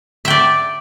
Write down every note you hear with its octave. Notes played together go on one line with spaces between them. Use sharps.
D5 E5 G5